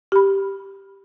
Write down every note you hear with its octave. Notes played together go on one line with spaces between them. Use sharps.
G4 B5